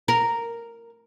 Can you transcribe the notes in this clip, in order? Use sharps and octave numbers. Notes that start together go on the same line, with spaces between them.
A#4